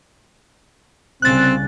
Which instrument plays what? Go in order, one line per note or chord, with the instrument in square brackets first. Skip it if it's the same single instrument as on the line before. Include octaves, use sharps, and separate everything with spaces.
[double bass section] C2 C#3 [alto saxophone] C4 [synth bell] F#6 A6